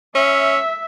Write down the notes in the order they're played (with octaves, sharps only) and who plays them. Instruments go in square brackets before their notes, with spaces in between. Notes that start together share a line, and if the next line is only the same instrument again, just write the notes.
[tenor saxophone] C#4 [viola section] E5